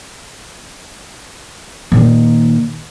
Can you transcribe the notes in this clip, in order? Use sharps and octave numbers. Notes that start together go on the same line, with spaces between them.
A#2 D#3